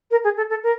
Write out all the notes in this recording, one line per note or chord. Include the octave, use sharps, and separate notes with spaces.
A#4
G#4
A4
A4
A#4